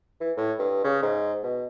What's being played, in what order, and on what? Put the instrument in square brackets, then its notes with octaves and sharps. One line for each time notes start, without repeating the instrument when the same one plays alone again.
[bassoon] E3
A2
G2
C#3
G#2
B2